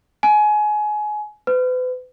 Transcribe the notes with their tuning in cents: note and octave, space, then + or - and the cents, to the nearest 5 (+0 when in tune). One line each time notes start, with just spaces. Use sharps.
G#5 +25
B4 +40